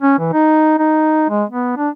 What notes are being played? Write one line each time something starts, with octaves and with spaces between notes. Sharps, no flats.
C#4
E3
D#4
D#4
G#3
B3
D4